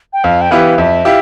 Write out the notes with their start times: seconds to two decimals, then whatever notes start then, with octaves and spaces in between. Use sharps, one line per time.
0.13 G5
0.24 F2 F5
0.41 G5
0.51 E3 B3 E4 G4 F5
0.78 F2 E5
1.05 E4 G4 F5